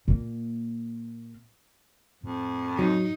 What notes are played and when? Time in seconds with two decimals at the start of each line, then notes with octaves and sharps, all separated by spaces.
0.08 A#2 A#3
2.23 F2 A2
2.79 F#3 D#4